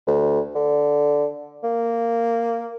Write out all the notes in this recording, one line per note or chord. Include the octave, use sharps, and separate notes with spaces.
D2
D3
A#3